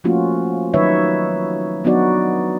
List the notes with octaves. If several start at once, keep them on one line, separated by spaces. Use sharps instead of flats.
F3 A3 A#3 C#4 F4 F#4
D#3 F#3 D#4 B4 C#5 E5
F#3 B3 D4 D#4 F#4 D5